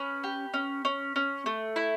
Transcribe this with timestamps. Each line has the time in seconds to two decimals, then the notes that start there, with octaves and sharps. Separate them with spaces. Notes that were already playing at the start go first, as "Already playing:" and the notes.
Already playing: C#4 B4
0.24 G4
0.54 C#4
0.85 C#4
1.16 C#4
1.46 A3
1.76 E4